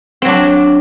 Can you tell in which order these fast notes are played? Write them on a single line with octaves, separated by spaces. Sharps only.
C4 F#3 D4